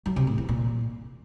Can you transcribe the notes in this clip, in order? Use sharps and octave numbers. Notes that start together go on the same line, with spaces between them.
F#3
C3
A2
E3
A#2